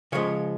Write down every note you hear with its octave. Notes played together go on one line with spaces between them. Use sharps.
C#3 F3 G#3 C#5